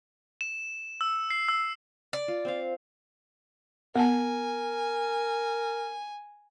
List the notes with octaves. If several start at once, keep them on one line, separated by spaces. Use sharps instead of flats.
E7
E6
C7
E6
D5
F4
C4 C5 F5
B3 A#4 G#5 A5